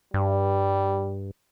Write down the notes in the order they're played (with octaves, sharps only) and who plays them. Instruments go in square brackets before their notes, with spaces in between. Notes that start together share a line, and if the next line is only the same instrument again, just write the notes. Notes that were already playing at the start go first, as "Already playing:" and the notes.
[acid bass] G2 [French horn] G3